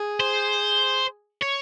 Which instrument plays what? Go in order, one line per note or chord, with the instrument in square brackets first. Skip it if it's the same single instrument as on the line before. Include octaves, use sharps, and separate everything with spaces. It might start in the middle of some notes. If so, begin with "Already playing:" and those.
Already playing: [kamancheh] G#4
[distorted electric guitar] C5
C#5